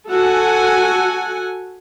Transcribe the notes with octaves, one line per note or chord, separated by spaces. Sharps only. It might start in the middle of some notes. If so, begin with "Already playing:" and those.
F#4 A4 F#5 G#5